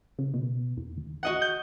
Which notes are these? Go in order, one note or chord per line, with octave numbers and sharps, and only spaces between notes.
C#3
B2
E2
D#2
F#4 D#5 F#5
G6